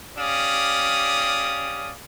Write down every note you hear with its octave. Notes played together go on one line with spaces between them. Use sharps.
C#4 G4 D5 F5 D#6